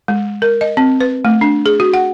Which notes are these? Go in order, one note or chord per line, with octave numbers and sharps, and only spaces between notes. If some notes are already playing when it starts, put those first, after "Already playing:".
G#3
A#4
D#5
C4
B4
A3
D4
G#4
F#4
F#5